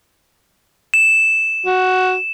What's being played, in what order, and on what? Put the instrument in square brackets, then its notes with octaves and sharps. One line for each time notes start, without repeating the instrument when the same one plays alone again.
[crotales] E7
[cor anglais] F#4